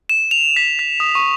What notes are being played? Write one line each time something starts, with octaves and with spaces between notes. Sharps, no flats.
E7
F7
B6
B6
D#6
C#6